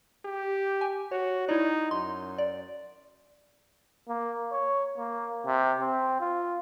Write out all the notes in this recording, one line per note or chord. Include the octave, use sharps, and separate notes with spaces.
G4
G#5
F#4 C#5
D#4 E4 D5
F#2 C6
D5
A#3
C#5
A#3
C3
C4
F4